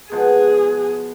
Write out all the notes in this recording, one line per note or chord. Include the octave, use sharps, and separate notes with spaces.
B2 F3 G#3 G#4